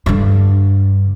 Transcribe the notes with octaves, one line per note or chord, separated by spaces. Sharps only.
G2 D3